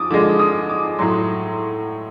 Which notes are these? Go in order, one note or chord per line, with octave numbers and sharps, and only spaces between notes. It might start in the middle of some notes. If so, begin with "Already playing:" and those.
Already playing: F3 D6 D#6
D3 F3 G#3 D6
D#6
D6
A2 F#3 C6